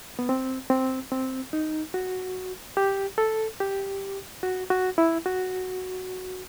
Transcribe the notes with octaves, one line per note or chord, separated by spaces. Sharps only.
B3
C4
C4
C4
D#4
F#4
G4
A4
G4
F#4
F#4
E4
F#4